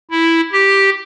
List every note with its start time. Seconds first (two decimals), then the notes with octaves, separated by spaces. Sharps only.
0.11 E4
0.53 G4